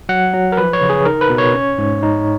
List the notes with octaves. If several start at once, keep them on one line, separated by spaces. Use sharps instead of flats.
F#3 F#5
F#3
A#4
F3 B4
C#5
C#3
G#4
D#4 A#4
B4
B2
C#5
C#4
G#2
D#4